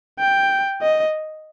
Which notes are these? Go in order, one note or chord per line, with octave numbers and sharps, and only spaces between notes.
G5
D#5